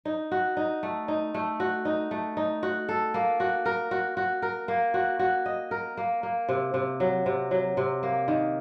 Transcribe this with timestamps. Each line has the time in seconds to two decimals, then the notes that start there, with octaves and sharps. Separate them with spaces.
0.05 D#4
0.31 F#4
0.57 D#4
0.83 A3
1.08 D#4
1.34 A3
1.60 F#4
1.85 D#4
2.11 A3
2.37 D#4
2.63 F#4
2.89 A4
3.14 A#3
3.40 F#4
3.65 A#4
3.91 F#4
4.17 F#4
4.42 A#4
4.68 A#3
4.94 F#4
5.19 F#4
5.46 D#5
5.71 A#4
5.97 A#3
6.23 A#3
6.49 C3
6.74 C3
7.00 F#3
7.26 C3
7.51 F#3
7.77 C3
8.03 A#3
8.28 D#3